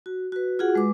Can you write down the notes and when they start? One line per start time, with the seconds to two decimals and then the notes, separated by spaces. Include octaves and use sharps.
0.06 F#4
0.32 F#4 B4
0.59 F4 F#4 G#4 F#5
0.75 G#3 B4 D6